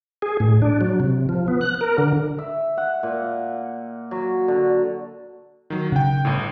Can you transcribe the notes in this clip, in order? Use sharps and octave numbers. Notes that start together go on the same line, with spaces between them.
G#4
A2
D4
F#3
C3
F3
B3
F#6
A#4
D3
E5
F#5
A#2
F#3
D3
D#3 F#3
C#3 F#5 G5
G1 A2